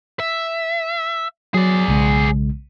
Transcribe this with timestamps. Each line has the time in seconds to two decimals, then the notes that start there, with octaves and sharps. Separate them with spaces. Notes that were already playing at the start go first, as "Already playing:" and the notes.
0.20 E5
1.54 F#3 G#4 D5
1.88 B1 C#3 G#3